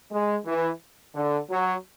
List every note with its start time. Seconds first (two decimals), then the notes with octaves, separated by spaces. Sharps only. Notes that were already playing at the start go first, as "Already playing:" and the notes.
0.12 G#3
0.46 E3
1.15 D3
1.50 F#3